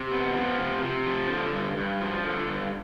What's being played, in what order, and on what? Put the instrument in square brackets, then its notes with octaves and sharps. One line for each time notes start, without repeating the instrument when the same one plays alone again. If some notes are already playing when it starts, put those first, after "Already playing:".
Already playing: [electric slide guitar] C3
B3
F3
C3
C3
F3
D3
G2
G2
F3
D3
G2